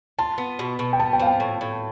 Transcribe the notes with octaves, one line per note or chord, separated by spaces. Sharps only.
F4 A5
B3
B2
B2
G5
B3 A5
G5
F3 F5
G5
A2
A2